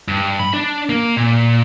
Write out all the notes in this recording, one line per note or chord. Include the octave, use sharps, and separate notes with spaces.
G2
B5
D4
A#3
A#2